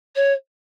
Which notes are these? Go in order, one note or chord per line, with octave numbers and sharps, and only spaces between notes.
C#5